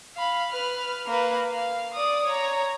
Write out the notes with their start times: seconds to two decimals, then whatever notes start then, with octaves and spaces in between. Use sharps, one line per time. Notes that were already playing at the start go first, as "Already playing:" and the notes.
0.15 F5 B5
0.51 B4 F6
1.06 A#3 B4
1.51 F5
1.95 D5 D#6
2.26 C#5 A#5